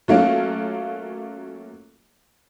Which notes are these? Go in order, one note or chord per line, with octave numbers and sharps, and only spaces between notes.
F#3 A3 A#3 C#4 F4